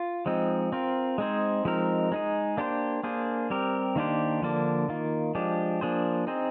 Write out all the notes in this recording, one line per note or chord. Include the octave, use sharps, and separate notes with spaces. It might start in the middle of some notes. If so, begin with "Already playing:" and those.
Already playing: F4
F3 G#3 C4 D#4
C4 F4 A#4
G#3 C4 D#4 G#4 C5
F3 G#3 C4 D#4 A#4
G#3 D#4 G#4
A#3 D4 G4 C5
A#3 D4 G#4 C5
G3 C4 G4 A#4
D#3 A#3 D4 G4 C5
D3 F3 A#3 D4
D#3 A#3 F4
F3 G#3 D4 G4
F3 A#3 D4 G#4 C5
C4 D#4 G#4 C5